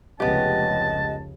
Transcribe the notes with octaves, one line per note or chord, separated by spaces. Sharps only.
F1 C#2 C#3 B3 G4 D#5 A5